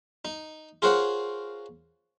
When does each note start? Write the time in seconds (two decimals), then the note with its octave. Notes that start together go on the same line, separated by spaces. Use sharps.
0.25 D#4
0.82 F4 G#4 A#4 C5 C#5 F#5